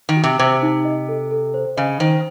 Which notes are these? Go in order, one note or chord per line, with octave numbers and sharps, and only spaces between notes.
D#3
F#4
C3
C3 C5
D#4
D#5
A4
A4
C5
C#3 D#5
D#3 C5